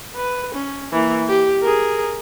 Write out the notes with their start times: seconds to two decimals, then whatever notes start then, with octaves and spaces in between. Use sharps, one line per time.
0.16 B4
0.54 C#4
0.92 E3 A#3
1.28 G4
1.62 G#4 A#4